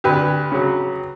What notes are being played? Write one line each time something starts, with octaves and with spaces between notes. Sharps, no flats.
D2 G4 B4
C#3 F#3